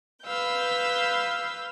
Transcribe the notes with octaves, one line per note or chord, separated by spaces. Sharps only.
B4 F5 E6 G6